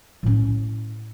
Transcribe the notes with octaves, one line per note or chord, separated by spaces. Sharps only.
A2 C#4